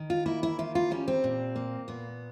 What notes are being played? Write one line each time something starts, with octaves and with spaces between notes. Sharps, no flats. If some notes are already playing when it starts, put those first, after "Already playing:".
Already playing: D#3
F4
A#3 E4
E4
D#3 F4
F4
G3 C#4
C4
A#2
A#3
A#2 B3